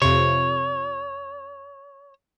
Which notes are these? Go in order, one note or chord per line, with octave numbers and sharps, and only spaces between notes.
F2 C3 C#5